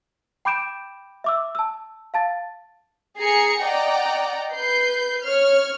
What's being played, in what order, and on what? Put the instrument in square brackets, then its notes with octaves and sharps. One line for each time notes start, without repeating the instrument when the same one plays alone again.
[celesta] G5 B5 D6 G6 D7 E7
E5 D6 E6
A5 E6
F5 A5 A6
[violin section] G#4 G#5 A#5 C7 C#7
D5 D#5 F#5 G5 A#5
B4 G6 C7
C#5 F6